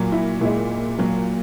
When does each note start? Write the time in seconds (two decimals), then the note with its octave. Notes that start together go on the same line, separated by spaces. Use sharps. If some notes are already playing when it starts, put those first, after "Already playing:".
Already playing: A#2 F#3
0.12 E4
0.41 A#2 G#3 E4
0.98 A#2 F#3